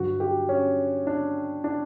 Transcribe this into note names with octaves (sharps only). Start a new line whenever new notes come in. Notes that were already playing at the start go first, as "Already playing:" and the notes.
Already playing: G2 D3 F#3 F#4
G4
C#4
D4
D4